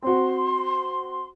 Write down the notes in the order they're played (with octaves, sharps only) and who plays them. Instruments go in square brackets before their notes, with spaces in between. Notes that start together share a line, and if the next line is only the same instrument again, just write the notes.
[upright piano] C4 F#4 [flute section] C6